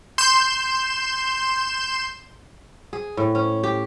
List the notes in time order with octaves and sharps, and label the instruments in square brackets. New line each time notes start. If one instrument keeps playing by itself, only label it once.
[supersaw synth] C6 G6 E7
[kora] G#4
A2
C#4
G4